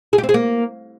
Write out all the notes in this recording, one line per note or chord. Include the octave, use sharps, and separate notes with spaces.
G#4
G4
C4
G#4
A#3